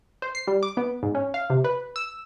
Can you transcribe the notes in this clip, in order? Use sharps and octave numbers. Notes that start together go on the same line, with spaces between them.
C5
C7
G3
D6
B3
G#2
C#4
F5
C3
B4
E6